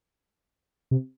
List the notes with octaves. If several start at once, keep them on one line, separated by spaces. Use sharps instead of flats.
C3